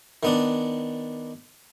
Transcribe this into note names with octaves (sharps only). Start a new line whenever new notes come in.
D#3 B3 D4